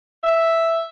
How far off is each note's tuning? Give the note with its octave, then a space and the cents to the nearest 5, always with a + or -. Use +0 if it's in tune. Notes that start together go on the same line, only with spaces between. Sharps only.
E5 +0